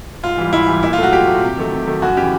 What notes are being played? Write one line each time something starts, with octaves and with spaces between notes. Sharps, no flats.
G#2 F4
E3 G3
G#2 E4
E3 G3
A#2 E4
F4
F#3 A3 F#4
A#2 G4
F#3 A3
C3
D#3 F#3 A3
C3
D#3 F#3 A3
F#2 F#4
C#3 E3 G#3 G4